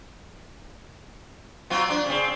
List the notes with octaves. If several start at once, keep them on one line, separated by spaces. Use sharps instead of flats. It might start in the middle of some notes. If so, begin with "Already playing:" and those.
F#3 C4 F4
D4
C#3 C4